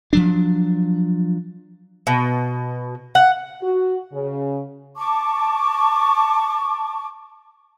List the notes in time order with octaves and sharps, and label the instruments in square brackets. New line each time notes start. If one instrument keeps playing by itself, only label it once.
[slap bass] F3 F#3 D4
[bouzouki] B2
F#5
[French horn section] F#4
C#3
[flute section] A5 C#6 D6